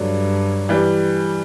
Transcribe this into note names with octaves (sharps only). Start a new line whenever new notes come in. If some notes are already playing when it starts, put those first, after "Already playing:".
Already playing: G2 D3 F#3
E3 G3